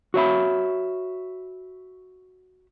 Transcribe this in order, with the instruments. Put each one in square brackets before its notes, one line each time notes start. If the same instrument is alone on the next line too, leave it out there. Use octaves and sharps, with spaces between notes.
[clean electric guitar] F#4 C#5 E5 B5